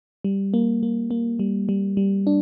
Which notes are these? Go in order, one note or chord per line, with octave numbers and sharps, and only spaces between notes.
G3
A#3
A#3
A#3
G3
G3
G3
D4